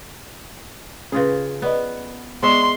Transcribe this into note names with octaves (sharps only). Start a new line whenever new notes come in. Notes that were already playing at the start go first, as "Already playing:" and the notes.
C#3 C#4 F4 G#4 B4
B3 B4 D5 D#5
G#3 B3 C#5 D5 E5 C6